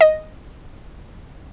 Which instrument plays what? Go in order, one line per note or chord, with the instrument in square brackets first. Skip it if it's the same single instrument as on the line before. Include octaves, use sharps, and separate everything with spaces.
[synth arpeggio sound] D#5